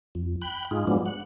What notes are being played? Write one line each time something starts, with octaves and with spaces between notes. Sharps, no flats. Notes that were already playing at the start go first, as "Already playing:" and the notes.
F2
G5 B5 F#6
G#2 D#4 F4 G#4
G#2 F3 F#3 G#3 B3 D4
F#5